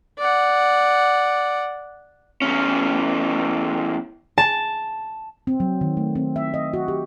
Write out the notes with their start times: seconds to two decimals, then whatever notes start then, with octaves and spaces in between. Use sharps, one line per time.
0.19 D5 F#5
2.42 E2 C#4
4.38 A5
5.47 C4
5.60 F#3
5.81 D#3
5.97 A3
6.15 C4
6.36 E5
6.54 D#5
6.73 F#4
6.88 G4